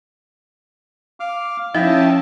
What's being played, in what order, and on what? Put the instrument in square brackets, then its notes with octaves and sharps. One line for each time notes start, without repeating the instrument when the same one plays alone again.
[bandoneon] F5 D6 F6
[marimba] F3 D#4 [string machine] C#4 A5 [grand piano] E4 [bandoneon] D#5 E5 G5